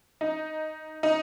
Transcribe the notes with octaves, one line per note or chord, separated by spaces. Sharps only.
D#4
D#4